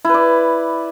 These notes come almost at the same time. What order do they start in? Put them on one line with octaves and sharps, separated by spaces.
E4 B4 D5